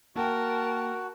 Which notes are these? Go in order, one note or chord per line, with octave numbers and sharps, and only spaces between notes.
A#3 F#4 A#4 G5 A5